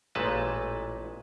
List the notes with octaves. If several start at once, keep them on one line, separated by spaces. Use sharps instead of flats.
A1 A#2 G#3 A3 B4 A5